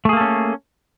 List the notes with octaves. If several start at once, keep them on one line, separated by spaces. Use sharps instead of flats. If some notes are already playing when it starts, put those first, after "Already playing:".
A3 A#3 C#4 G#4 A4